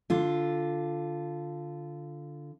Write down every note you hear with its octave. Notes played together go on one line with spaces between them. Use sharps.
D3 F4